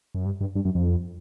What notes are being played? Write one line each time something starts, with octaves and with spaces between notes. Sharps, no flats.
F#2
G2
G2
G2
F#2
F2